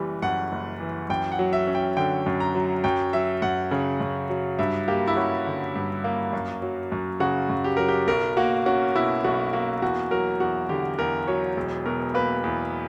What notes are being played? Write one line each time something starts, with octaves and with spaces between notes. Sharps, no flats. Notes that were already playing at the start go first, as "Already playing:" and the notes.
Already playing: F#1 E3 G3
F#2 F#5
F#1
E3
F#2 G5
F#5
F#3
E5
C#4
G5
D3 G5
F#2
A#5
F#3
F#2 G5
F#3 E5
F#2 F#5
C#3
F#2
F#3
G2 E5
A#3 G4
E4
C#4 F#4
D3
G2
A#3
F#2
F#3
F#2
C#3 F#4
F#2
G4
F#3 A#4
G4
B1 A#4
A#3 F#4
C#4 F#4
B2 E4
B1 F#4
A#3 F#4
E2 F#4
F#3 A#4
E2 F#4
D3 G4
E2 A#4
F#3 C#5
E1
B2 A#4
A#3 B4
E2